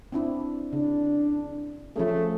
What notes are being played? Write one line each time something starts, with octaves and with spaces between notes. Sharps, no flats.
C4 D4 E4
C#3 D4
F3 A3 C#4 G#4